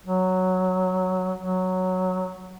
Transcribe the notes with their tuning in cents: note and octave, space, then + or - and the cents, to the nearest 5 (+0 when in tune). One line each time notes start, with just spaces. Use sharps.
F#3 +0
F#3 +0